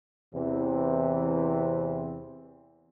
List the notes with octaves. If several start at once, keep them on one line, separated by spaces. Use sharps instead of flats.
E2 C3 E3 C4